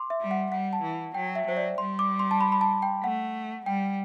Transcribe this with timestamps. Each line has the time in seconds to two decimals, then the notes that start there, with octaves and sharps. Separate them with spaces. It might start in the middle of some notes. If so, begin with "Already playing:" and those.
Already playing: C6 D6
0.10 E5
0.21 G3
0.31 F#5
0.51 G3 F#5
0.73 A5
0.83 E3
1.14 F#3 G5
1.35 E5
1.47 F#3 C5
1.57 D5
1.78 G3 C6
1.99 D6
2.19 C6
2.31 A5
2.41 B5
2.52 B5
2.61 A5
2.82 G5
3.04 A3 F#5
3.66 G3 G5